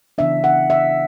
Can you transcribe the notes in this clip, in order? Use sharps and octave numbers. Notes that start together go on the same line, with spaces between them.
C#3 E3 B3 D4 E5
F#5
E5